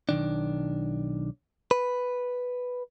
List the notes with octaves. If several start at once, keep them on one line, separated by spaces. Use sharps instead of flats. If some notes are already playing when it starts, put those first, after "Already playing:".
B1 D#3 D4
B4